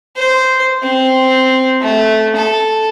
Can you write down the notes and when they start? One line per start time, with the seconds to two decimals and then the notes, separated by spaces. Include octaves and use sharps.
0.17 C5
0.82 C4
1.81 A3
2.36 A4